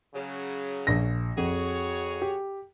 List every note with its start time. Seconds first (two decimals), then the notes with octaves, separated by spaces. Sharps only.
0.14 C#3 F#3
0.87 A#1 A#6
1.37 F2 F#4 G#4 C#5
2.22 G4